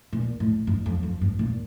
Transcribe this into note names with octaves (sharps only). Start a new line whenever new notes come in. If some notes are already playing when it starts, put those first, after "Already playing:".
A#2
A2
G2
F2
F2
G2
A#2